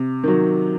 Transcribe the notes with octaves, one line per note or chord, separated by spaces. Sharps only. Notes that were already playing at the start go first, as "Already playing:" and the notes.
Already playing: C3
D#3 F#3